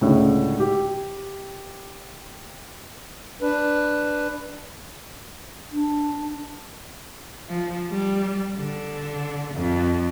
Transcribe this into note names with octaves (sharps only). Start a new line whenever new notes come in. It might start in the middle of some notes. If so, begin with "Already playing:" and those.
C#2 A2 D3
G4
D4 B4
D4
F3
G3
D3
F2